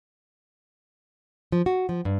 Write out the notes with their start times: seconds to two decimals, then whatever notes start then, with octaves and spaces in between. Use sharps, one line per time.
1.52 F3
1.66 F#4
1.89 F3
2.05 G2